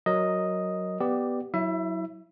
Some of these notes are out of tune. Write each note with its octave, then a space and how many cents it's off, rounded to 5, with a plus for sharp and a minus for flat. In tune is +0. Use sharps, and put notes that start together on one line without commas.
F#3 +0 A#4 +0 D#5 +0
B3 +0 G4 -5 D5 +10
F#3 +0 E4 -20 E5 +25